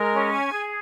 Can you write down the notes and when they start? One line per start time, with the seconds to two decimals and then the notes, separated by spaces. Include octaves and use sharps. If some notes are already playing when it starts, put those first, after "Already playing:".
Already playing: G#3 A#4
0.13 C#4
0.32 G#5
0.51 G#4